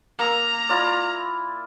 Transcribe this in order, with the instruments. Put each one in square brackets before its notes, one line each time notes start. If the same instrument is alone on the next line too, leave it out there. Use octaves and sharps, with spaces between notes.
[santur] A#3 E6 [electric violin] A#5
[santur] E4 F4 D5